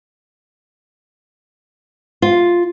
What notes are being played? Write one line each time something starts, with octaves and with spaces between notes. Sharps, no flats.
F4